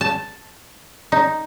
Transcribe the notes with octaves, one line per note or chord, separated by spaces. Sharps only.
A5
D#4